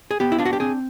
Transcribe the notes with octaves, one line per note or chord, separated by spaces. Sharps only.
G#4
B3 G4
E4
D4 F4
F#4
G4
C4 G#4